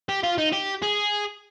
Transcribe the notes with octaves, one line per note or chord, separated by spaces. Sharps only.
G4
F4
D#4
G4
G#4